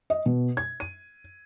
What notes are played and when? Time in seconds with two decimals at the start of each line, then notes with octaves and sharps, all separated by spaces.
0.10 D#5
0.26 B2
0.57 G#6
0.80 D#7